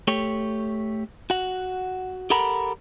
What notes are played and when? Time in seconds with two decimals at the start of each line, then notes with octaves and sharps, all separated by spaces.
0.08 A3 G4 C#5
1.30 F#4 F#5
2.30 G4 A4 A#4 F#5 A#5 B5